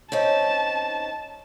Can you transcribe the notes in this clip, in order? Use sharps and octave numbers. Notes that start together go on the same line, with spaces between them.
C4 C#4 D#4 A5